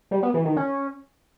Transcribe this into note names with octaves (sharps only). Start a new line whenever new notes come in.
G3
B3
E3
D#3
C#4